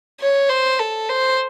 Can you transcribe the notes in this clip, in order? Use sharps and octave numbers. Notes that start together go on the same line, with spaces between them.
C#5
C5
A4
C5